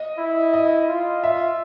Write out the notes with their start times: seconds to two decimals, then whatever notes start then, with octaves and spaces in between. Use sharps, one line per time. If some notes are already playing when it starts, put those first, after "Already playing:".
Already playing: D#5
0.18 E4
0.53 D#5
0.89 F4
1.24 E5